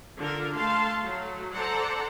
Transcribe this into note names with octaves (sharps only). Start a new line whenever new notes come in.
D3 F4 A#4
A3 F5 A5 C6
F#3 A3
A4 C5 D5 F#5 A#5